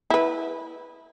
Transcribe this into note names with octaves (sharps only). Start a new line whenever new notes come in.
E4 B4